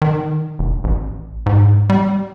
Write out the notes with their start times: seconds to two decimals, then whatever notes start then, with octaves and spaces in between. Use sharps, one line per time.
0.02 D#3
0.59 F1
0.84 A1
1.46 G#2
1.90 G3